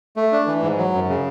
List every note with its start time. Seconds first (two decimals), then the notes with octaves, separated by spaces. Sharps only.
0.17 A3
0.32 D4
0.47 E3
0.62 G#2
0.78 F#3
0.93 F#2
1.09 C#3